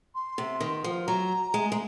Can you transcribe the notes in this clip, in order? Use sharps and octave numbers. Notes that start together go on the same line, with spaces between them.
C6
C3
D#3
F3
F#3 A#5
G#3
G#3